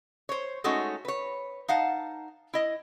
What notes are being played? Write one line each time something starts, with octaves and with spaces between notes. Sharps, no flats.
C5 C#5
G#3 A3 C#4 D#4 F#4
B4 C#5
D#4 F5 F#5 A5
E4 D#5